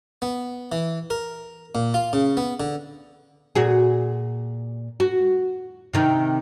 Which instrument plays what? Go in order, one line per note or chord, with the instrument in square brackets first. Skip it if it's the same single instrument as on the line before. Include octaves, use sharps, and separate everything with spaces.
[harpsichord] B3
E3
A#4
A#2
F4
C#3
B3
D3
[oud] A#2 F#4 G#4
F#4
C3 D#3 D#4